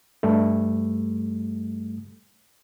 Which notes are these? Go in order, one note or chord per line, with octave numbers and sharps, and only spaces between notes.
G2 G3 A3